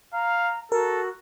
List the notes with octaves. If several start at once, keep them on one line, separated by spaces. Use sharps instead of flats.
F5 A#5
F#4 A4 A#4